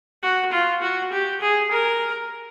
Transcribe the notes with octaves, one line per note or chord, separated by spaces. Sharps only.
F#4
F4
F#4
G4
G#4
A#4